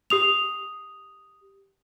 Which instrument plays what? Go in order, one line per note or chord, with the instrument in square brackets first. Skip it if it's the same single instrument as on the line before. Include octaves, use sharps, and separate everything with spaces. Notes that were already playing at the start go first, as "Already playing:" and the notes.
[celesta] G4 D#6 F7